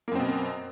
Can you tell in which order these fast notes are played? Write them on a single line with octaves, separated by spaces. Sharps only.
A#3 F#2 C4 B2